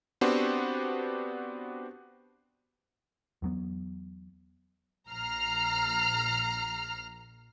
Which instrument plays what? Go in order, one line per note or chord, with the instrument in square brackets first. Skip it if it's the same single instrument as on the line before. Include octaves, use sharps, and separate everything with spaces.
[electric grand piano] B3 C4 D4 F#4 G4 C5
[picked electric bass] E2 F#3 B3
[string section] A#1 A#5 F6 C7